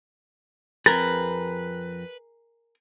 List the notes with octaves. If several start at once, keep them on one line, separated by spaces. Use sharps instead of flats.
F2 C4 G#4 A#4 B4 A6